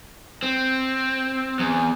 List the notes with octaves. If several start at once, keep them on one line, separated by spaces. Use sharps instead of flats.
C4
E2